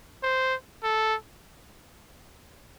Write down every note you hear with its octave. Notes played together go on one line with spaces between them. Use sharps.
C5
A4